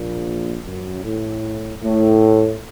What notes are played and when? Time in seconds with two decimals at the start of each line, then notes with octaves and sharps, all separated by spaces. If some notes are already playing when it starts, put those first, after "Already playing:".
Already playing: A#1 A#2
0.65 F#2
1.04 A2
1.83 A2